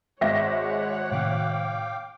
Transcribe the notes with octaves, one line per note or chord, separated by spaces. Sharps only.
G#1 G#3 C#5 E5 F#5 A#6
A2 C3 D#3 F5 G5 D6